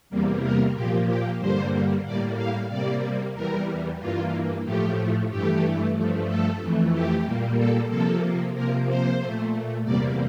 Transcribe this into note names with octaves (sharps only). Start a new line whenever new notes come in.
E2 C3 G3 A#3
A#4
A#2 F3 A#3 G4
G4
G2 D3 G3 A#3 C5
A2 G3 A#3 D5
F5
C3 G3 A#3 D5
E2 E3 G3 A#4
G2 E3 A#3 F4
A2 F3 A3 G4
G2 E3 A3 G4
G2 F3 A3
A4
F2 E3 A3
G4
A#2 G3 A#3
A4
C3 F3 A#3 A4
C3 F3 A#3 A#4
C5
A#2 A3
E2 C3 G3 A#3 D5